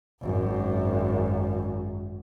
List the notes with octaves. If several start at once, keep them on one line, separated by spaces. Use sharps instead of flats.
G#1 F#2